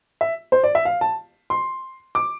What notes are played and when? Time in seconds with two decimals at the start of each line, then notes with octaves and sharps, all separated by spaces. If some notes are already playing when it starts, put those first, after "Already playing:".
0.21 E5
0.52 C5
0.64 D5
0.75 E5
0.85 F5
1.01 A5
1.50 C6
2.15 D6